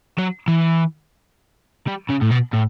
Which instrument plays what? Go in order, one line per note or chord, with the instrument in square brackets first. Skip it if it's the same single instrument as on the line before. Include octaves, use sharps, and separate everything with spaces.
[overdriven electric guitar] F#3
E3
G3
C#3
A2
B2
A2